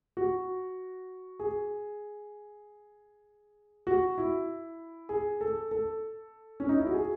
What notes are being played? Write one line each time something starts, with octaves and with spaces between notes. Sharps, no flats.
F#4
G#4
F#4
E4
G#4
A4
A4
C#4
D#4
E4
F#4
G#4